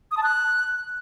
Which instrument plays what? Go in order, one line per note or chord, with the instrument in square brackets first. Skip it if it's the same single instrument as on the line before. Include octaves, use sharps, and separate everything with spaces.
[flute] D#6
A5
F#6